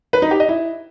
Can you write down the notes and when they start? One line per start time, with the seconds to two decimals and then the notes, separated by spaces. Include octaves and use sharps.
0.13 B4
0.22 D#4
0.31 G4
0.40 D#5
0.49 E4